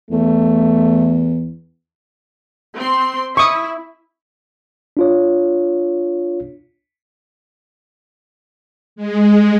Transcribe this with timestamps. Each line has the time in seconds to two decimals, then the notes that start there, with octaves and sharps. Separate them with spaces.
0.11 E2 A3
2.76 C4 C6
3.37 E4 C#6 D#6
4.97 D4 F4 C#5
8.96 G#3